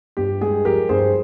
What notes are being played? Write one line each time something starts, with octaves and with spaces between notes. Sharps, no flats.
G2 G4
G#3 G#4
F3 G4 A#4
G2 G#4 C5